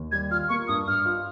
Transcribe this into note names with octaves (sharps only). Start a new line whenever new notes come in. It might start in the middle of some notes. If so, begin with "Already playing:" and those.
Already playing: D#2
G3 G#6
F4 F6
A#3 C#6
G2 D#6
G2 F6
F4